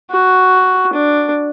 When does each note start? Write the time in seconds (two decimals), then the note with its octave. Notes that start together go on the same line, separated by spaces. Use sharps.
0.11 F#4
0.93 D4